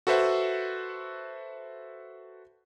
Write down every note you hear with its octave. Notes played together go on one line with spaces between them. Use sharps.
F#4 A4 B4 C5 E5 F#5